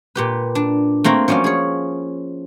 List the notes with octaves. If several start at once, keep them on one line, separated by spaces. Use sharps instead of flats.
A#2 G4 B4
D4
A3 A#3 C4 A#4
F3 F#3 C#4 D5 F5
G#4 C#5